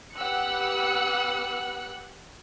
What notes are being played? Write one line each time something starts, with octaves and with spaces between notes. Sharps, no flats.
B3 G4 F#5 E6 F#6 C#7